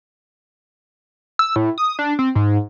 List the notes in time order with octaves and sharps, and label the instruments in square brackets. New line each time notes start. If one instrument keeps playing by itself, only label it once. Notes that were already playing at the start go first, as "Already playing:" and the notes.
[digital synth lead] E6
A2
D#6
D4
C4
G#2